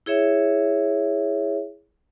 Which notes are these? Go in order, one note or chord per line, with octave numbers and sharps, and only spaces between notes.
E4 G#4 C#5 E5